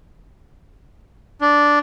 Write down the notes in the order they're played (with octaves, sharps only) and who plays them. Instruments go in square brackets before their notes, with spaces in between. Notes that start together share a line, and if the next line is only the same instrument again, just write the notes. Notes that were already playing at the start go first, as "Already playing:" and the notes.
[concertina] D4